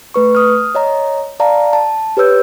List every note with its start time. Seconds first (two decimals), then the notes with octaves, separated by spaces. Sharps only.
0.14 A3 B4 C#6
0.35 D#6 F6
0.75 C#5 D#5 A#5
1.40 D5 F5 A5 A#5
1.73 A5
2.17 G4 B4 C#5 E6 G6